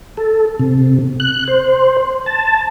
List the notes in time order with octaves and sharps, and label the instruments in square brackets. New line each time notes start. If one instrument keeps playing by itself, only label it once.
[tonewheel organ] A4
C3
F#6
C5
A5